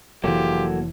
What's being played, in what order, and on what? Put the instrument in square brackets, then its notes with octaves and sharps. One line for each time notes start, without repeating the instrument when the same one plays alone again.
[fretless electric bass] F1 E3 [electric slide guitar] F#3 A#3 A4 [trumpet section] F4 G4